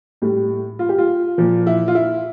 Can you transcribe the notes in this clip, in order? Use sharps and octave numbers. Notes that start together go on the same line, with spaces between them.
A2 G3
F4
G4
F4
A#2 F3
E4
F4
E4